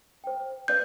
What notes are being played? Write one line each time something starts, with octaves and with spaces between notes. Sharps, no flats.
C5 G5
B4 D5 F5 G6